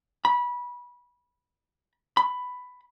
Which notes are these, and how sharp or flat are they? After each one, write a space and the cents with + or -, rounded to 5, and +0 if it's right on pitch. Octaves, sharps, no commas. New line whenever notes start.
B5 -20
B5 +10